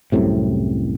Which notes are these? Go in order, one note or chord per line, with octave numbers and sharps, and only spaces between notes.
C2 F#2 A2 C3